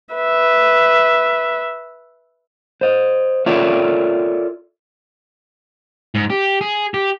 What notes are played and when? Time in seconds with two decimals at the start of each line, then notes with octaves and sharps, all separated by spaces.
0.14 B4 E5
2.81 C5 D#5
3.46 F4 A4 A#4 C#5 D5 E5
6.15 G#2
6.30 G4
6.61 G#4
6.94 G4